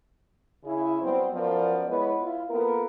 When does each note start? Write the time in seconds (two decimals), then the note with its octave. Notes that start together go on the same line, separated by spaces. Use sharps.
0.64 C#3 E4 G#4
1.02 F#3 G3 B3 C4
1.33 F#2 F3 B3 A#4 D5
1.87 G#3 B3 E4 B4 C#5 D#5
2.20 E4 F4
2.50 A#3 B3 F4 A4 A#4